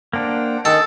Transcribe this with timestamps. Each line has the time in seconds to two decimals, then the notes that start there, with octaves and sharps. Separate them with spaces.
0.13 A#3 D4 C5 F#5 G5
0.65 D#3 C#4 G#4 A4